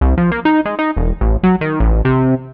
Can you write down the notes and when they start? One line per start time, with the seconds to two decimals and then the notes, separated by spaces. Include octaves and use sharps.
0.01 C2
0.17 F3
0.31 A#3
0.45 D#4
0.65 G#3
0.79 D#4
0.97 E1
1.21 A1
1.43 F#3
1.61 D#3
1.80 A1
2.05 C3